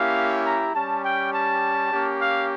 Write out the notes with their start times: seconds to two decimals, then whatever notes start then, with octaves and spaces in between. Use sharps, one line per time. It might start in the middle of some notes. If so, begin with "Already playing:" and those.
Already playing: A#3 C#4 E4 G4 F5
0.44 A#5
0.74 G3 C#4 G4 A5
1.02 G5
1.32 A5
1.91 A#3 C#4 G4
2.19 F5